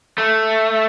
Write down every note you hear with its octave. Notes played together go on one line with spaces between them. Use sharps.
A3